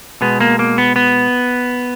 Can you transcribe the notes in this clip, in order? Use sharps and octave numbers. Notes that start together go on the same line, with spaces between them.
B2 G#3 B3
A#3
A#3
B3
B3